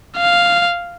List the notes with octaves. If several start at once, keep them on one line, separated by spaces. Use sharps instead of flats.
F5